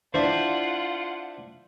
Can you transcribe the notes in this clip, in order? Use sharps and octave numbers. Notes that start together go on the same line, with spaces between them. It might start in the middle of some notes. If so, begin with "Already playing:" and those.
D4 E4 F4 C5 F#5